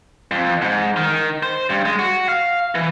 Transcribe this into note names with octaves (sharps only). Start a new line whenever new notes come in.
F2
G#2
D#3
C5
G2
G#3
F#4
F5
E3